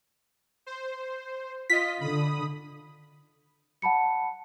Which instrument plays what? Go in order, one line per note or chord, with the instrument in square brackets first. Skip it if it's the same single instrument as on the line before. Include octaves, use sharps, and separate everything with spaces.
[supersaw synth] C5
[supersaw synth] F4 D#5 [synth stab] B6
[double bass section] D3 [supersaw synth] B5 D#6
[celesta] F#5 A5 B5 C#7